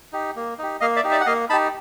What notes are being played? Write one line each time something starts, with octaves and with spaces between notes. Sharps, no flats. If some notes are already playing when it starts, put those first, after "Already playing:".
D#4 G4
A#3
D#4 G4
A#3 D#5 F5
D5 E5
D#4 G4
D5 E5
F#5
A#3 D#5 F5
D#4 G4 A5 B5